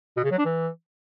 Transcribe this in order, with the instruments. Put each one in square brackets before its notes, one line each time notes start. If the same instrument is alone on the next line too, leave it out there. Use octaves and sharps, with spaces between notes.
[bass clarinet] B2
C#3
F#3
D4
E3